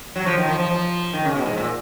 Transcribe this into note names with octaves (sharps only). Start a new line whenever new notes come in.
F#3
F3
D#3
F3
F3
F3
D#3
C#3
B2
G#2
A#2